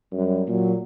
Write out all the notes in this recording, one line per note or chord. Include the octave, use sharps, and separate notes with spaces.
F#2 G3
A#2 F#3